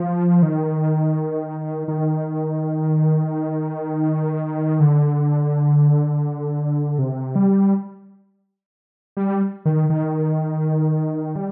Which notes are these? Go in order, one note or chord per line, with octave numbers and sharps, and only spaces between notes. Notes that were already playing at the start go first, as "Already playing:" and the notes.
Already playing: F3
D#3
D#3
D3
C3
G3
G3
D#3
D#3
G3